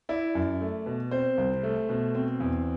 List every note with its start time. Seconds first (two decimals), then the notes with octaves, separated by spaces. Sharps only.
0.09 E4 D5
0.35 F#2
0.60 A3
0.86 B2
1.11 C4 C5
1.38 C2
1.63 A3
1.89 B2
2.15 C4
2.40 E2